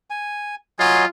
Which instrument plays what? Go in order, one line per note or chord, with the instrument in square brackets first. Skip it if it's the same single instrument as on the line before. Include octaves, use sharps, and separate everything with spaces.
[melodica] G#5
[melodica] F#3 D#5 C6 [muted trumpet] F4 [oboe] G#5